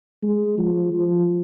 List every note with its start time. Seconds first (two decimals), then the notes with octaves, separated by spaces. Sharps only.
0.23 G#3
0.58 F3
0.93 F3